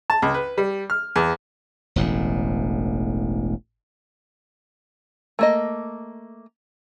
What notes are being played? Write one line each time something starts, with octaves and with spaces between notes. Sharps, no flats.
A5
C#2
B4
G3
F6
E2
E1 A1 A2
A3 A#3 D#5